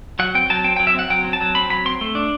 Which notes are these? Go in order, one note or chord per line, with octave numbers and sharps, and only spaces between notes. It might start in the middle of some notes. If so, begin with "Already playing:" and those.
F#3 F#5
C4 G5
F#3 A5
C4 G5
F#3 G5
E5
C4 F#5
F#3 G5
C4
A5
F#3
C4 B5
F#3 B5
C4 C6
A3
D4